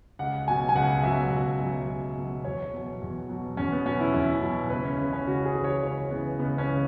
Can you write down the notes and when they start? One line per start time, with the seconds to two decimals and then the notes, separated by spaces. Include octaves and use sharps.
0.19 C#2 F#5
0.47 B2 F#3 G#5
0.69 G#5
0.75 C#2 F#5
1.03 B2 F#3 E5
1.32 C#2
1.60 B2 F#3
1.88 C#2
2.17 B2 F#3
2.44 E2 C#5
2.73 B2 F#3
3.01 E2
3.29 B2 F#3
3.57 E2 C#4
3.72 B3
3.86 B2 F#3 C#4
4.00 E4
4.14 E2 E4
4.42 B2 F#3
4.70 C#2 B4
4.85 C#4
4.98 C#3 E3
5.12 C#4
5.27 C#2 F#4
5.45 G#4
5.55 C#3 E3
5.64 C#5
5.83 C#2 C#5
6.11 C#3 E3 B3
6.39 C#2 B3
6.58 C#4
6.68 C#3 E3